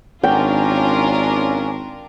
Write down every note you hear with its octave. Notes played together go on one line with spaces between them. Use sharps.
G#1 C#4 D4 F4 A#4 G5